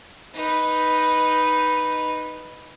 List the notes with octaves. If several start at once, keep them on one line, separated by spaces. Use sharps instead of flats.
D#4 B4